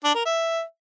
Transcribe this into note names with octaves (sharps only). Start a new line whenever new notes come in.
D4
A#4
E5